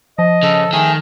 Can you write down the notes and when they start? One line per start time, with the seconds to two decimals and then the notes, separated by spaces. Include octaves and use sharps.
0.19 F3 D#5
0.43 C#3 A4
0.73 D#3 A3 G#4